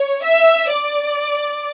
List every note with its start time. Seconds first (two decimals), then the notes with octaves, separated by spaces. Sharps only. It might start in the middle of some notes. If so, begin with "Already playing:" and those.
Already playing: C#5
0.24 E5
0.71 D5